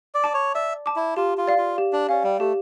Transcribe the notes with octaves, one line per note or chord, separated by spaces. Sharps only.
D5
A5 D6
C#5
D5 E5
A5 D6
E4
F4 G4
F4
D5 F5
F4
G4
D4
C#4 D5 F5
G3
A3 G4